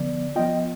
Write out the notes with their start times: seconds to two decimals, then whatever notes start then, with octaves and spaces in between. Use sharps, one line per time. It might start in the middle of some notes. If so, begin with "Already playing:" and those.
Already playing: D3 F3 B3 D5
0.36 F3 B3 F4 D#5 G5